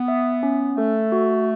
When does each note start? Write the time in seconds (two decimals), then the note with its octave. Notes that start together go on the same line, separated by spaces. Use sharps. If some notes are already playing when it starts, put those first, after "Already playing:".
Already playing: B3
0.08 E5
0.43 C#4
0.77 A3 A4
1.12 F#4